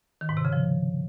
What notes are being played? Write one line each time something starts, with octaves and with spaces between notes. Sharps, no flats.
D#3
G#2
C3
C#3
F3